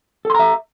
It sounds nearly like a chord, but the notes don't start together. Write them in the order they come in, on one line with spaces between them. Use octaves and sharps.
A4 C6 A#5 E5